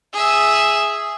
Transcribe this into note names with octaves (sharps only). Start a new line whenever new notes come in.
G#4 E5